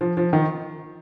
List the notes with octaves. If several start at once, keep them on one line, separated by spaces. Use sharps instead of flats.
F3
F3
D#3